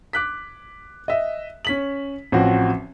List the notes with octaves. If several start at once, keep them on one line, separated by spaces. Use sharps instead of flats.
D6 F#6 B6
D#5 E5
C#4 B6 F#7
A1 F3 C4 F#4